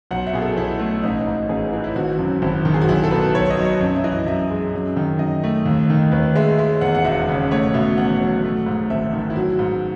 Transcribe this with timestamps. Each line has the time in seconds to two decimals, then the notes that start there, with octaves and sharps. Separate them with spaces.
0.11 B1 F#5
0.27 E5
0.33 B2 G#4
0.41 A4
0.56 B1 E4
0.79 A3
1.03 A1 D#4
1.27 G#2
1.49 A1 G#4
1.73 E3
1.84 E4
1.95 G#1 F#4
2.19 F#2
2.42 G#1 E4
2.65 D#3
2.74 G#4
2.81 F#4
2.89 B1 E4
3.04 A4
3.11 B2 B4
3.35 B1 C#5
3.50 D#5
3.57 F#3
3.65 C#5
3.81 F#2
3.96 E5
4.04 E3 D#5
4.27 F#2 E5
4.50 G#3
4.74 F#2
4.96 D#3
5.19 F#2 D#5
5.43 A3
5.66 D#2
5.90 D#3
6.12 D#2 B4
6.35 G#3 E5
6.58 G#3 E5
6.81 E2 F#5
6.95 F#5
7.04 E1 E5
7.28 C#3
7.51 A3 C#5
7.74 B2 E5
7.98 E2 F#5
8.21 F#3
8.44 A3
8.66 G#2
8.90 G#1 E5
9.13 D#3
9.30 E4
9.36 F#3 F#4
9.59 G#2